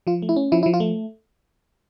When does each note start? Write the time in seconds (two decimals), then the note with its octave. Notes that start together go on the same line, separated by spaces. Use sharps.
0.07 F3 F4
0.22 A3
0.29 E4
0.36 C#4
0.52 F3 E4
0.63 E4
0.66 F3
0.74 F4
0.80 A3